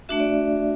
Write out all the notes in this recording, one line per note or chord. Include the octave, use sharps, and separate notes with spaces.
A3 D4 F#4 E5
D5